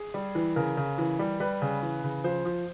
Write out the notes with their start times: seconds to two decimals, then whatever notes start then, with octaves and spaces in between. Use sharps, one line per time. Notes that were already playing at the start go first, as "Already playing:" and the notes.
Already playing: G#4
0.14 G3
0.35 E3
0.56 C#3 A#4
0.77 C#3
0.98 E3
1.19 G3
1.40 G3 B4
1.62 C#3
1.82 E3
2.04 C#3
2.24 F3 C5
2.45 F3